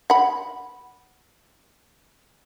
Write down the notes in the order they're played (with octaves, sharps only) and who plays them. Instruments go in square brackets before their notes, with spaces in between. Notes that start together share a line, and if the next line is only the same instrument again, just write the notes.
[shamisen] F#5 B5